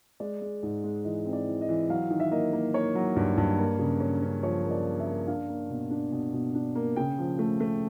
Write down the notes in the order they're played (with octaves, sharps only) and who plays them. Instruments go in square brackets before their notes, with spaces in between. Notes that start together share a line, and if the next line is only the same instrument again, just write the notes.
[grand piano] G#3 D5
G#3
G#2
G#3
E3 D#5
C4
D5
E3
D#5
E3
F#3 F5
D#3
E5
A#3 D#5
A#3
A#3 C#5
F#3
G2
G2
A#3
C#3
C#4
C#4
F3 C#5
A#3
D5
A#3
E5
A#3
D4 F5
A#3
B2
D4
B2
B2
D4
A#3
C#3 G5
F3
A3
A3